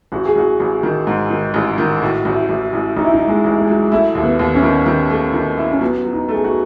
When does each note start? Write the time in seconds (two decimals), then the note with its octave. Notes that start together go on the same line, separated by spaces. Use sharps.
0.12 A1 F#4
0.25 G#4
0.36 A1 F#4
0.60 A1
0.83 D#3
1.07 G#2
1.30 D#3
1.54 A1
1.78 D#3
2.02 A2 F#4
2.25 A1 F#4
2.34 E4
2.49 A1
2.73 A1
2.97 A1 D#4
3.05 E4
3.13 D#4
3.21 A1
3.28 G#3
3.44 A1
3.60 G#3
3.68 F#3
3.92 A3 E4
4.15 D#2
4.23 B3
4.39 D#2
4.55 C#4
4.63 D#3
4.86 D#3
5.10 A3
5.33 D#3
5.57 E4
5.71 C#4
5.81 F#3 B3
6.05 F#3
6.13 D#4
6.28 A3
6.35 G#4
6.44 F#4